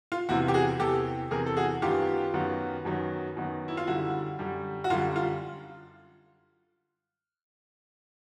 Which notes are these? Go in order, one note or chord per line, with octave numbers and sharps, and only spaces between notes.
F4
E2 C3 E3 E4 F#4
G4
F#4 G#4
E2 C3 E3 G4 A4
E2 C3 E3 G#4 A#4
A4
F#4 G#4
F#2 D#3 F#3 B3 F4 G4
F#2 D#3 F#3 B3
F#2 D#3 F#3 B3
F#2 D#3 F#3 B3
E4
F4
F#2 D3 G3 E4 F#4
F#2 D3 G3
F#4
F#2 D3 G3 F4
F4